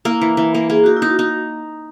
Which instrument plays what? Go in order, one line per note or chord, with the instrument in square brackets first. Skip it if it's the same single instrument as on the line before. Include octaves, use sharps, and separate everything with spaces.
[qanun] A#3 [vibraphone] E4
[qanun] E3
E3
A#3
[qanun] A#3 [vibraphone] G#4
[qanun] D#4 [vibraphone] F#4
[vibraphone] E4
[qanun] D#4
[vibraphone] F#4
[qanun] D#4